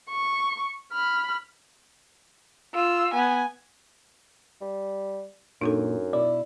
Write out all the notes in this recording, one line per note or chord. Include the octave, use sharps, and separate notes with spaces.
C#6
B5 F6
F4 E6
B3 G#5
G3
F#2 A#2 D4 D#4 A4
B2 E4 D5